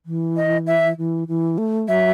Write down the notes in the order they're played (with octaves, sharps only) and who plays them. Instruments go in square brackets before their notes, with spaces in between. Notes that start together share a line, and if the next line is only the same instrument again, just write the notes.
[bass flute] E3
[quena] D#5
E5
[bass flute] E3
E3
A3
[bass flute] F#3 [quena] E5